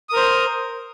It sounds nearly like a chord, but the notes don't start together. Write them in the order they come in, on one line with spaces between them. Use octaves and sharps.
D#6 A#4 C5